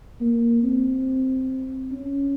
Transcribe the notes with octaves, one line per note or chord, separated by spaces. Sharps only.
A#3
C4
C#4